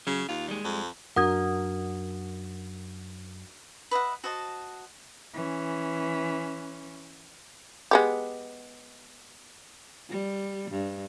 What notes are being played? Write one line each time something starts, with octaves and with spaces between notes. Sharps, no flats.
C#3 F#3
D#2 F4
G3 G#3
F2
F#2 D4 F#4 A#4 F#5 D#6 G#6
B4 D#5 E5 F#5
F#4 C5 D#5 A5
E3 C#4
G#3 B3 G4
G3
G2